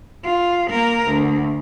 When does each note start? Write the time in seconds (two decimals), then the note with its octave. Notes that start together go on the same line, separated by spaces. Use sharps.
0.24 F4
0.70 A#3 A#4
1.07 D2